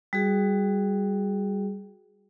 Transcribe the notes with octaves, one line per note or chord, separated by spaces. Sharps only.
G3 F#4 G#4